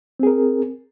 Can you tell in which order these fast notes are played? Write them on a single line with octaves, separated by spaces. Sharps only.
C4 G#4 A#4